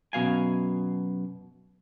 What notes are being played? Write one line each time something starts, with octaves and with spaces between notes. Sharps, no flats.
F#2 B2 F5 G#5